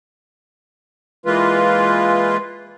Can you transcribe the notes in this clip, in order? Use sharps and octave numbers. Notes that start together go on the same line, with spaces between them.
E3 G#3 A#3 F4 B4